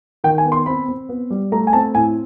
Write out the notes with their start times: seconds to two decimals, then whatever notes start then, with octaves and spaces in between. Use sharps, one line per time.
0.24 D#3 G5
0.38 G#5
0.45 B3
0.52 C6
0.66 C4 B5
0.88 C4
1.09 B3
1.30 G3
1.52 A3 A#5
1.67 G#5
1.73 C4 A5
1.94 A2 G#5